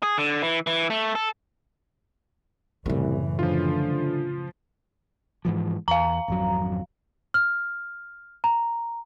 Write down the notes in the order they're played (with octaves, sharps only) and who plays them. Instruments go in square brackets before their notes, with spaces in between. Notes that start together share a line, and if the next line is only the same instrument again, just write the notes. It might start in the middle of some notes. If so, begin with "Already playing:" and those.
[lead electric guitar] G#4
D3
E3
E3
A3
A4
[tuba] C2 [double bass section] F#2 A2 E3 [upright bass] C#3 A3
[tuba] D3 [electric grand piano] F3 F4
[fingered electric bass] G#2 E3 F3
[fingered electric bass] E2 [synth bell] F5 A#5
[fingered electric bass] G#1 F2 F#3
[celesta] F6
A#5